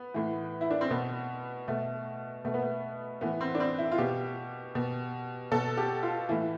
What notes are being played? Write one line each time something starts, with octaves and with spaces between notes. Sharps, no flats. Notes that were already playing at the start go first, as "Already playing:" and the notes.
Already playing: B3
A2 E3
E4
D4
C4
B2 B3
B2 A3
B2 A3
B3
A3
A2 E3 B3
C4
D4
C4
E4
F4
B2 G4
B2
B2 A4
G4
F4
A2 E3 E4